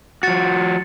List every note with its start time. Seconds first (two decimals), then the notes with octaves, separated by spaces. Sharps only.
0.23 F3 F#4 A6 C#7